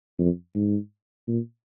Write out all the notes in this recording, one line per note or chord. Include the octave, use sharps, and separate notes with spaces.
F2
G#2
A#2